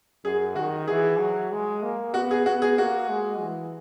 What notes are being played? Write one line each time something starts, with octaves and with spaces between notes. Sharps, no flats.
F#2 G#4
D#3 F#4
E3 G#4
F#3
G#3
A#3
B3 F#4
G#4
B3 F#4
G#4
A#3 F#4
G#3
E3